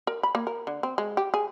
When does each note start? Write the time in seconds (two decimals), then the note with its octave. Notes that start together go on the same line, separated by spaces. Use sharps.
0.07 A#4
0.23 B5
0.35 A#3
0.47 A#4
0.67 D3
0.83 C4
0.98 G#3
1.17 G4
1.34 G#4